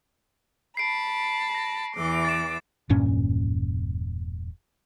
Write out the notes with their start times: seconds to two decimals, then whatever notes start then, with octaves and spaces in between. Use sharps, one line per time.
0.77 A5 B5 C7 D7
1.55 A#6
1.95 E2 E3 D6
2.25 A6 E7
2.90 E1 G2 A#2 C#4